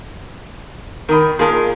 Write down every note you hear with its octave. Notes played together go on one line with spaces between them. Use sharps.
D#3 A#4 D#5 B5
A#2 G#4 A#4 D#5 A5